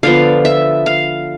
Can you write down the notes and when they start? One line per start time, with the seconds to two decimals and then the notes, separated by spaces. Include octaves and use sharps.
0.03 D3 F3 B3 F5
0.45 E5
0.86 F5